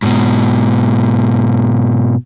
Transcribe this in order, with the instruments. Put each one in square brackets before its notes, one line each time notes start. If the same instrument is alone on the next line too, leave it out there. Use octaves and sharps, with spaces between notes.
[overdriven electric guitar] G#2 B2